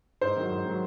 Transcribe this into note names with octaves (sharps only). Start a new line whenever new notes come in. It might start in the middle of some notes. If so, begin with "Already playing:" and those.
G#2 C5
D#3 F#3
G#2
D#3 F#3